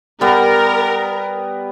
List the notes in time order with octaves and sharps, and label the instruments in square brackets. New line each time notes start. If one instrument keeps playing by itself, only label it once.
[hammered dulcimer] G3 B3 [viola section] A#4